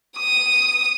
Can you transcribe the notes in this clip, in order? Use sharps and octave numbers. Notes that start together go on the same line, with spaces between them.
D#6